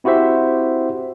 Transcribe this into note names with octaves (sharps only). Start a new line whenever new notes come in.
C4 E4 F#4 G4 C5 E5